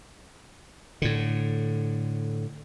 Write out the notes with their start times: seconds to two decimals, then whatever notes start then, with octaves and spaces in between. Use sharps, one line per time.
1.02 A2 D3